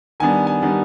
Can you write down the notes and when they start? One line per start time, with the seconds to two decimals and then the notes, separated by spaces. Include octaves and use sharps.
0.20 D#3 G3 B3 D4 G#5
0.47 G#5
0.62 D#3 G3 B3 D4